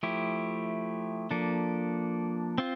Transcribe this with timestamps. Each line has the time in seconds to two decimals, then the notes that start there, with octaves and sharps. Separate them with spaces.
0.03 F3 A3 E4 G4
1.31 F3 A#3 D4 A4
2.58 C4 F4